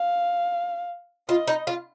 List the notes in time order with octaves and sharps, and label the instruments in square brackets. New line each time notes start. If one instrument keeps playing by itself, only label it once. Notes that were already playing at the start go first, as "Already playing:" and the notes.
Already playing: [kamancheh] F5
[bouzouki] F4 [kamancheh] D#5
[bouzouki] D#4
F4